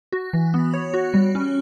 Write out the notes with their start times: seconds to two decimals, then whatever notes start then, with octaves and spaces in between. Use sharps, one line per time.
0.12 F#4
0.33 E3
0.54 B3
0.74 C#5
0.94 F#4
1.14 G3
1.35 C#4